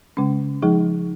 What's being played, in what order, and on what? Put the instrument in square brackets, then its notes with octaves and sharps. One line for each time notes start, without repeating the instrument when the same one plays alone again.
[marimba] C#3 G#3 C#4
F3 G#3 D#4 G#4